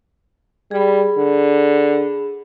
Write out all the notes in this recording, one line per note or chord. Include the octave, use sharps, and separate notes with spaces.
G3 G#4 B5
D3